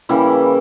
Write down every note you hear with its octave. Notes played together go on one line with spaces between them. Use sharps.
C#3 E3 G3 A#3 E4